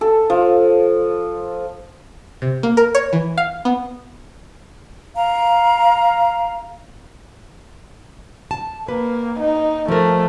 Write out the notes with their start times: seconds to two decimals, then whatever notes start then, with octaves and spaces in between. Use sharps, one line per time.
0.01 A4
0.30 F3
2.42 C3
2.63 A#3
2.77 A#4
2.95 C#5
3.13 E3
3.38 F5
3.65 B3
5.15 F5 A#5
8.51 A5
8.89 A#3 B4
9.39 D#4
9.88 F3 A3 A#4